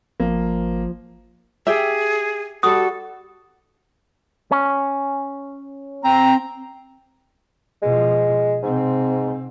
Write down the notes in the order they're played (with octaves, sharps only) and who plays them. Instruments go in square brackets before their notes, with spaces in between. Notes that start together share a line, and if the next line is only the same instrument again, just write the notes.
[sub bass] G#1 [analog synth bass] F3 [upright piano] A#3
[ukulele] G4 E5 [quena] G#4
[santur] G3 F#4 [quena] A4 [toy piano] D#6
[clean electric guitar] C#4
[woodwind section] C4 A#5
[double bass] B2 F3 [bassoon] G#3
[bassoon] G#2 [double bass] C3 C4